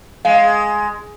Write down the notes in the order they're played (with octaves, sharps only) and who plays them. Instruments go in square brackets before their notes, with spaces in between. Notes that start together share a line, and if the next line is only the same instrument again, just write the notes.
[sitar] G#3 [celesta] F5
[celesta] F5